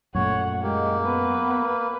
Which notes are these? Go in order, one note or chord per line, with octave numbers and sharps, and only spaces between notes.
F#2 A#2 A3 C#5 F#5
G#3 A#3 G4
B3 B4
B4